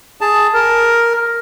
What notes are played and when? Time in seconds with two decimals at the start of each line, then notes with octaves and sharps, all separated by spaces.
0.21 G#4 A5
0.54 A#4